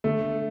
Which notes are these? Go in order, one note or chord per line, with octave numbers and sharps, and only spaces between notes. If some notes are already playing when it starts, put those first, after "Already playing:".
D3 A3